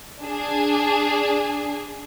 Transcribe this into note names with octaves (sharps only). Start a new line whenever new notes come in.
D4 G#4